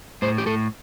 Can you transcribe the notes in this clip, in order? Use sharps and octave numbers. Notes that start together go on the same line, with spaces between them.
A2 C5
G4
A2 A4